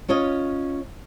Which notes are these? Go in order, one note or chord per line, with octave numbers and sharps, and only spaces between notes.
C#4 F4 C#5 D#5